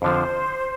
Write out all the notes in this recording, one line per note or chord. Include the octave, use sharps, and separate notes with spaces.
F2 D3 F3 C5